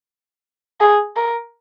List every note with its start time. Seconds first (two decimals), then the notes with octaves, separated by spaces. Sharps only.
0.81 G#4
1.16 A#4